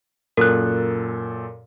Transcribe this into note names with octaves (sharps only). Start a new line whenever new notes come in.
F#2 A#2 A4 A#4 F#6